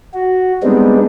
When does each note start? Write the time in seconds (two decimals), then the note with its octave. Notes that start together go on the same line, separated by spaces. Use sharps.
0.14 F#4
0.63 G3 G#3 B3 C4 D4 D#4